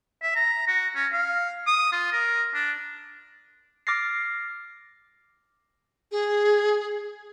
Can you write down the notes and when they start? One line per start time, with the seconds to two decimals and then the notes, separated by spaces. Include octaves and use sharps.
0.22 E5
0.35 A#5
0.67 F#4
0.95 C#4
1.12 F5
1.67 D#6
1.92 F4
2.12 A#4
2.54 D4
3.87 D6 F6 A6 A#6 C7
6.12 G#4